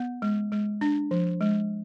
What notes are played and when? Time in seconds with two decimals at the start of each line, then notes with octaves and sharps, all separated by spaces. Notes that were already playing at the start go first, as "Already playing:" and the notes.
Already playing: B3
0.22 G#3
0.52 G#3
0.81 D4
1.11 F3
1.41 G#3